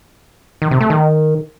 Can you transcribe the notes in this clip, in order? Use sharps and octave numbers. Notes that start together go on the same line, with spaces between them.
D#3
C3
A3
D#3